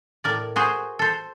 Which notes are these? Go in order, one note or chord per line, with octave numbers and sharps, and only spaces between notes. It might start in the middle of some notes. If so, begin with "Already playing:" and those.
A2 A#4 D5
F#4 G#4 C5
A4 C5